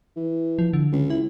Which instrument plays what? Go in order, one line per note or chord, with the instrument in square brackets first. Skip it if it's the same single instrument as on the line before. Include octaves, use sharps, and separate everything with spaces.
[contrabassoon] E3
[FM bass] F3
D3
[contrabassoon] C#2
[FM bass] E4